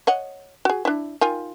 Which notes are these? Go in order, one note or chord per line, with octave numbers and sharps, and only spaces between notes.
C#5 D#5 F#5
F#4 G#4
D4 E4
D#3 F4 G#5